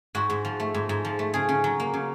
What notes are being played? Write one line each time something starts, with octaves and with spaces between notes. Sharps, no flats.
G#2 F#4
G#2
F3
A3
G#2
G#2
F3
A3
C#3 G#4
C#3
F#3
A#3
C#3